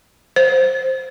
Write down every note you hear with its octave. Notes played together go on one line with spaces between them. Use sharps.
C5